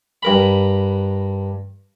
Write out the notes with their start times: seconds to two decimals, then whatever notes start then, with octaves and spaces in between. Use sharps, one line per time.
0.23 G2 A#4 B5